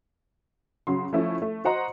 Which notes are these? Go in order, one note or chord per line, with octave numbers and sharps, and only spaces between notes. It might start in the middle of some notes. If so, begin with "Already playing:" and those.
C#3 F#3 C6
F3 A3 C#4 E4
A3
F#4 C5 D#5 F#5 A#5 C6